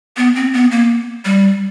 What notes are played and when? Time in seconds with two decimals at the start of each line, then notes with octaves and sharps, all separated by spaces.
0.17 B3
0.35 C4
0.54 B3
0.71 A#3
1.25 G3